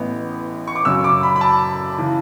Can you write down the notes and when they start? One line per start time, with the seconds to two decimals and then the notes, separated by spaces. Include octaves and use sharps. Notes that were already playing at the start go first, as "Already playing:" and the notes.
Already playing: A1 A2 E3 B3
0.67 C#6
0.75 D6
0.85 F#2 C#3 F#3 C#4 E6
1.04 D6
1.23 B5
1.36 B5
1.41 A5
1.98 C#3 E3